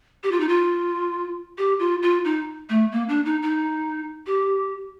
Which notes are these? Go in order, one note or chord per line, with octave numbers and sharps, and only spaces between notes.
G4
F4
D#4
F4
G4
F4
F4
D#4
A3
A#3
D4
D#4
D#4
G4